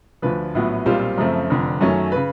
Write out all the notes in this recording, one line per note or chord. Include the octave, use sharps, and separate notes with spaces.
D2 D3 F3 B4
A#1 A2 F#3 B3
B1 A#2 G3 C4 F4 C5
F#2 C#3 F3 A3 C4
F1 F2 D3
F#2 D#3 F#3 A3 C#4
C#3 B4